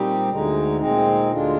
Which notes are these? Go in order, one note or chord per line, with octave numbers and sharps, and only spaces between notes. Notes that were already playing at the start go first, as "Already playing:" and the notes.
Already playing: A#2 G3 C4 D#4 G4
D2 D3 G#3 D#4
A#2 G#3 C4 D#4
D2 D3 G#3 D4 F4